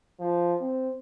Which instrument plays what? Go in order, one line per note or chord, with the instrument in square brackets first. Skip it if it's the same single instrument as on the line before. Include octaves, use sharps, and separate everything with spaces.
[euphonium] F3
C4